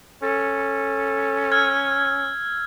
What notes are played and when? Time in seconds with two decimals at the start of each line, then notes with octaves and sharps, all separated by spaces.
0.23 C#4 A4
1.52 E6 F6 G#6